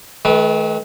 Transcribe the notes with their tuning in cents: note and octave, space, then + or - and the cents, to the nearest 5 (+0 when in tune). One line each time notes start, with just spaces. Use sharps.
D#3 +20 A3 -40 B4 -10